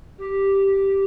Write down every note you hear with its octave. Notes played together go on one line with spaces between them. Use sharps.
G4